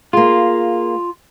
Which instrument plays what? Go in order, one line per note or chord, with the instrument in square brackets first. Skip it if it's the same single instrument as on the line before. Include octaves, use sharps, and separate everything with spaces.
[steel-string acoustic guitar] A#3 G#4 [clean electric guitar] F4